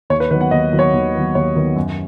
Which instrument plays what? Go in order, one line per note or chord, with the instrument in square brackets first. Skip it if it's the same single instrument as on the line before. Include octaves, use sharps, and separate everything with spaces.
[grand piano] D#2 C#5
B4
D#3 F#3 B3 B4
F#5
D#2 D#5
D#3 F#3 B3
C#5
D#2
D#3 F#3 B3
D#2 C#5
D#3 F#3 B3
F#2